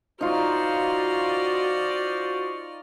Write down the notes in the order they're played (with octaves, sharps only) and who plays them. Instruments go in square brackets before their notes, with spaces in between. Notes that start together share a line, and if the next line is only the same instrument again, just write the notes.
[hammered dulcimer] D#4 F4 [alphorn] F#4 [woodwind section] C5 C#6 [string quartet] D5 D#5 F6